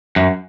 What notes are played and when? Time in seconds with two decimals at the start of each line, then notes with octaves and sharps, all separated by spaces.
0.16 F#2